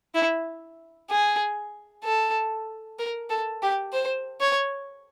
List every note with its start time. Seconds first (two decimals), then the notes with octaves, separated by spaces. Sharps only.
0.15 E4
1.10 G#4
2.04 A4
2.99 A#4
3.30 A4
3.62 G4
3.93 C5
4.40 C#5